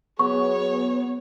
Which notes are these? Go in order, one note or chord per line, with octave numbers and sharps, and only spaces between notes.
F#3 B3 G#4 C#5 C#6